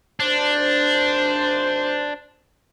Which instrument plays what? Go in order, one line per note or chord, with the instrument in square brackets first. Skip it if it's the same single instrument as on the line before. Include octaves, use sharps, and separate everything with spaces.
[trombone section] G#1 C5 [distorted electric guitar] D4